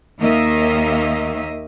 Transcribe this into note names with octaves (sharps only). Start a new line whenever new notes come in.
D#2 D#3 A#3 D#5 E5